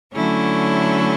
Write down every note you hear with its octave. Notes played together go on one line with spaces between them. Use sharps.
D3 F#3 A3 C#4 E4